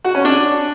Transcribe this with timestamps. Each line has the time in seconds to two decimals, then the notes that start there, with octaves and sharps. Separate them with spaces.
0.05 F#4
0.15 C#4
0.25 D4